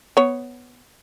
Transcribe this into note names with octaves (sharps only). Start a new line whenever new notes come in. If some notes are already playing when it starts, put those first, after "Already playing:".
B3 C#5